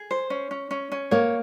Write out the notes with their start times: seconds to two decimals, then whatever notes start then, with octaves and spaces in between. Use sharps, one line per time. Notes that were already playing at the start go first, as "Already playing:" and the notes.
Already playing: G#4
0.11 C5
0.30 C#4
0.51 C#4
0.71 C#4
0.92 C#4
1.11 A#3 C#5